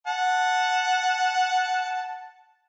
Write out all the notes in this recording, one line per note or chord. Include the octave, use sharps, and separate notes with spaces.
F#5 A5